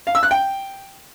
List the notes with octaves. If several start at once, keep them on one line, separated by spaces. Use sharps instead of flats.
F5
E6
F#6
G5